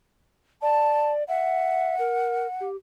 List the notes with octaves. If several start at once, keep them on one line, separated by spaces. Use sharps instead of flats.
D5 A5
E5 F#5
A#4
G4